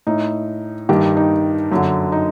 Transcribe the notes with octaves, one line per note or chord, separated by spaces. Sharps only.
A2 D#4
G2 D#3 G4
D#4
F#2 D3
D#4